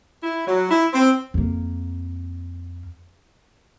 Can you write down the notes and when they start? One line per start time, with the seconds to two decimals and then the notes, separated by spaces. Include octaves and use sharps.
0.23 E4
0.47 F#3
0.71 E4
0.93 C4
1.34 F2 A#3